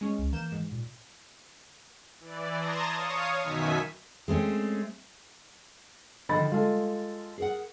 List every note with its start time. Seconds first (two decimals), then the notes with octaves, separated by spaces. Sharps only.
0.01 G#3 C#4
0.19 C#2
0.33 E3 A#3 G6 E7
0.52 G#2
0.72 A#2
2.20 E3 D5
2.57 A5 A#5 C6 D#6 G#6 A#6
2.95 C#5 F5 C#6 D#6
3.41 F#2 B2 D#3 E5 G#5 B6
4.28 G#3 A3 C4 C#4
6.29 D3 D#3 F3 D#5 B5 A6
6.52 G#3 F4 A4
7.38 G#4 A#4 F#5